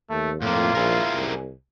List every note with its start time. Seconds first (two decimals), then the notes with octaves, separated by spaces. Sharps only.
0.10 D#2 A3
0.42 F2 A2 A#3 F4
0.75 A#1 E4 G#4 A#4
1.14 C2